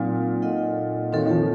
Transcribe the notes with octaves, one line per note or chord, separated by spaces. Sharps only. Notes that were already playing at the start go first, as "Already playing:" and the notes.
Already playing: A#2 F#3 C4 D#4
D#4 A4 D#5 F#5
D#3 C4 F#4 A4 C#5 F5
D#3
F3